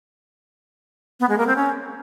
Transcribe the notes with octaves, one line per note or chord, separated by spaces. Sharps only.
B3
G#3
A#3
C4
C#4